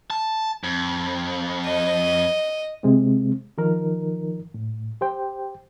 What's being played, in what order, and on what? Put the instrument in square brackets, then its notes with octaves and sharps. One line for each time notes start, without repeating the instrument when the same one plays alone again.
[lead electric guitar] A5
F2
[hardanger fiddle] D#5
[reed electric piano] C3 G#3 C4
D#3 F3 D#4 A#4
A2
G4 C5 G5